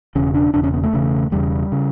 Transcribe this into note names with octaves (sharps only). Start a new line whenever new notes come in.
E1 E2 C#3 C#4
D4
E1 E2 C#3 D4
C#4
B3
A3
E1 E2 C#3
E1 E2 C#3 G3
C#3